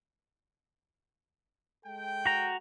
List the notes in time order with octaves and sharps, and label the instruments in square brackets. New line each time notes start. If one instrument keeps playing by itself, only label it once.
[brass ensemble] G#3 A4 G5
[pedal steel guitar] F#4 A#5